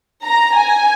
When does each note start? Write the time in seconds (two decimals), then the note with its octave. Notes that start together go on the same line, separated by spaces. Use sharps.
0.24 A#5
0.55 G#5